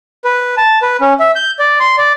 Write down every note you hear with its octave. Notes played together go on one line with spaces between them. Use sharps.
B4
A5
B4
C#4
E5
G6
D5
C6
D5